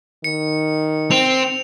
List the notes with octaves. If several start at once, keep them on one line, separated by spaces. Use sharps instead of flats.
D#3 C#7
C4 F7